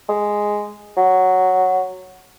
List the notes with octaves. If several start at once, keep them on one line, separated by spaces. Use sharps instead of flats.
G#3
F#3